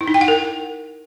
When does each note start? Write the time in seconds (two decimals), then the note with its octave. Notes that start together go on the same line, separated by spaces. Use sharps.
0.01 E4
0.08 D#4
0.14 G5
0.21 F#5
0.28 A#4